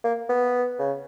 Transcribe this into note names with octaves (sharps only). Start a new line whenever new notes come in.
A#3
B3
C#3